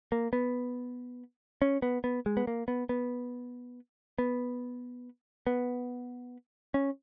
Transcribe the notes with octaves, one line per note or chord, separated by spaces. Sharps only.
A#3
B3
C#4
B3
B3
G#3
B3
A#3
B3
B3
B3
B3
C#4